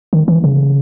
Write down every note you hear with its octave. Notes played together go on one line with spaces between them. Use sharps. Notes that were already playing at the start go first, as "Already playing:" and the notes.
D#3
E3
C#3